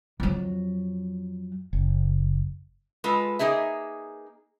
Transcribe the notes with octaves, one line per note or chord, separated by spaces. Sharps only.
F2 F#3
F#1
G#3 F4 A4 B4
A#3 D#4 G#4 E5